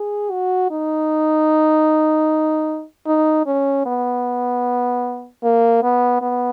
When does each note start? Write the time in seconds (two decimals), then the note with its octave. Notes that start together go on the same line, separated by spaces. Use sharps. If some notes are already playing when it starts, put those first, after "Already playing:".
Already playing: G#4
0.31 F#4
0.71 D#4
3.07 D#4
3.47 C#4
3.86 B3
5.44 A#3
5.83 B3
6.22 B3